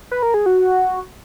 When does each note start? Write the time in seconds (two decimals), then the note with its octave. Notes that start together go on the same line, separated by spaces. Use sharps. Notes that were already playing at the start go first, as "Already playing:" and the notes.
0.11 B4
0.23 A#4
0.34 G#4
0.46 F#4